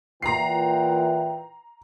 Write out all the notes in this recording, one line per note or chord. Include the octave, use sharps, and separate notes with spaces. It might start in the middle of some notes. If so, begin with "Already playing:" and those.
A#2 E3 F#5 G5 A#5 C7